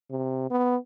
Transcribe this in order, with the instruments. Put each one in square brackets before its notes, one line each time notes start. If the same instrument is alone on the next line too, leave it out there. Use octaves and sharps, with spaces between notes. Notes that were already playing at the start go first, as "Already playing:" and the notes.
[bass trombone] C3
B3